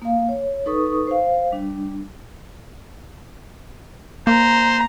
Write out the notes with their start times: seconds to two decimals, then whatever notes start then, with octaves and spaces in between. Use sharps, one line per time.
0.02 A#3 F5
0.29 C#5
0.66 D#4 A4 B4 C#6 D#6
1.07 C5 F5
1.52 G3 D4
4.27 A#3 C5 A#5